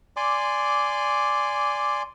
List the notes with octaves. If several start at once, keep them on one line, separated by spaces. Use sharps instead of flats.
D5 G#5 C6 D6